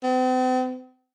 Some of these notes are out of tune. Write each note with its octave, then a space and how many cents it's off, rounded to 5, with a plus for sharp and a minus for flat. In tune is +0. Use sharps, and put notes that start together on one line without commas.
C4 -45